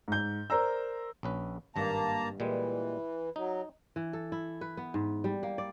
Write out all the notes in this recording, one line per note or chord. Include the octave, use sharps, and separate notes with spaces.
G#2 G6
A#4 C5 D5 A#5 E6
A#1 C#4 B4
G#1 G2 A#3 A5 A#5
A#2 E3 G3 G#3
F#3 D#4
E3
A4
E4
B4
B3
G#2
G3
A#3
D5